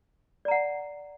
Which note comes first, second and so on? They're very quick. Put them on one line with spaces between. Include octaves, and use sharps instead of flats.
D5 A#5 F#5